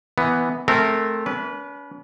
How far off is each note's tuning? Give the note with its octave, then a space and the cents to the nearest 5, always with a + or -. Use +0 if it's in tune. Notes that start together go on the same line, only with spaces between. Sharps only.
E3 +0 B3 +0
A3 -15 C4 +0 A#4 -25
C#4 +45 B4 -10